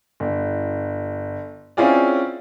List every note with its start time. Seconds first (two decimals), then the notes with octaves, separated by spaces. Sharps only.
0.20 G1
1.77 C4 C#4 E4 F4 G#4 D5